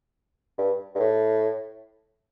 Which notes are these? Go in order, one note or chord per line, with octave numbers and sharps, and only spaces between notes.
G2
G2
A2